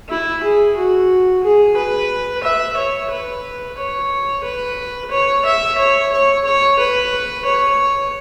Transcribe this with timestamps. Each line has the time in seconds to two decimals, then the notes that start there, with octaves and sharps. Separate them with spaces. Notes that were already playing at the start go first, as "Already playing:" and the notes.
0.09 E4
0.43 G#4
0.76 F#4
1.43 G#4
1.76 B4
2.44 E5
2.77 C#5
3.11 B4
3.78 C#5
4.44 B4
5.11 C#5
5.45 E5
5.78 C#5
6.12 C#5
6.45 C#5
6.79 B4
7.45 C#5